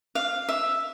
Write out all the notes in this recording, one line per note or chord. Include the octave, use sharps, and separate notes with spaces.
F5
E5